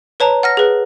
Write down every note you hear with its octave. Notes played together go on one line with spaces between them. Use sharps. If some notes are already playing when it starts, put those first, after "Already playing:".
B4 C#5 A5 A#5
F#5 F6 A#6
G#4 B4